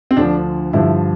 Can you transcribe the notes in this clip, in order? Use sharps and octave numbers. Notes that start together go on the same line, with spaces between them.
C4
D2 D3 F3 D4
G2 D3 F3 E4